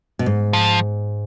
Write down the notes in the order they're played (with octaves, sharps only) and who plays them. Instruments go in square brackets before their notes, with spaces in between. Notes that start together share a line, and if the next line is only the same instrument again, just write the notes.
[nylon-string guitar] B2
G#2
[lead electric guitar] F3